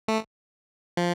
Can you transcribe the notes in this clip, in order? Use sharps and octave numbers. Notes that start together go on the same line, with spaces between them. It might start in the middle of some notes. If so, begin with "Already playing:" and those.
A3
F3